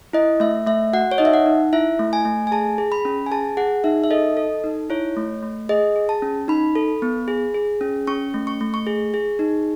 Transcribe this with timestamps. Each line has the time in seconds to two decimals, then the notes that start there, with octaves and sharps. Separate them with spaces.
0.13 E4 D#5
0.40 A3 E5
0.67 A3 E5
0.93 F#4 F#5
1.11 C#5
1.18 D#4 D#5
1.25 E5
1.33 F#5
1.46 D#4
1.73 E4 E5
1.99 A3
2.13 G#5
2.25 A3
2.47 G#5
2.51 G#4 A5
2.78 G#4
2.92 B5
3.05 C#4
3.26 G#5
3.31 G#4 A5
3.57 G#4 F#5
3.84 D#4 E5
4.04 E5
4.10 A4 D#5
4.37 A4
4.64 D#4
4.90 E4 C#5
5.17 A3
5.43 A3
5.69 G#4 D#5
5.96 G#4
6.09 A5
6.22 C#4
6.48 D#4 B5
6.76 A4
7.02 B3
7.28 G#4
7.54 G#4
7.81 C#4
8.07 C#4 C#6
8.34 A3
8.47 C#6
8.61 A3
8.74 C#6
8.87 G#4
9.14 G#4
9.39 D#4